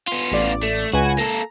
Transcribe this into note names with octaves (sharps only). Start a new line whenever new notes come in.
B3 F4
A1 D5
A3
C#2 F#4 B4 G#5
A#3 A4 A#5